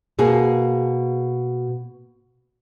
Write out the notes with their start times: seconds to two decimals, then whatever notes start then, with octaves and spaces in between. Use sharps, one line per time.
0.19 B2 A#3 G#4